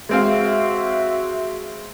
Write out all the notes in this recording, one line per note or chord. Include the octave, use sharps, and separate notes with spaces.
G#3 C4 F#4 E5 F5